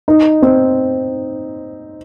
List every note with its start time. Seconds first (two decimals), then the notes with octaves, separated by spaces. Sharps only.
0.08 D#4
0.42 C4